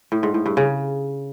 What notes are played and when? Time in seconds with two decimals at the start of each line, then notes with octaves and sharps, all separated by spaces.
0.12 A2
0.23 G#2
0.34 A2
0.46 G2
0.57 C#3